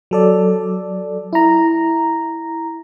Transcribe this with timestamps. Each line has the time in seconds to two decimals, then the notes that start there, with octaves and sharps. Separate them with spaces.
0.11 F#3 A4 D5
1.33 E4 A#5